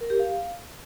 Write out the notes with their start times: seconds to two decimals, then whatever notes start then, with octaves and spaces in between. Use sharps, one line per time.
0.01 A#4
0.10 G4
0.19 F5